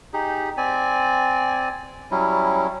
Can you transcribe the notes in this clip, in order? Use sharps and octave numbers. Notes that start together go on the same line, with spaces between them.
D#4 G4 G#4
C4 D5 G#5
F#3 G3 C#4 E4